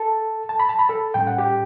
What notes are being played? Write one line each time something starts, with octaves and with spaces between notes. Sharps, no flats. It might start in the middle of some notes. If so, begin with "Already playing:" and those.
Already playing: A4 A5
A5
B5
A5
B5
A4 A5
A2 G3 C#4 G5
F#5
G4 G5